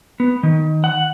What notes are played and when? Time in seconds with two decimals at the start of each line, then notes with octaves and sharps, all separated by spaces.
0.20 B3
0.43 D#3
0.84 F#5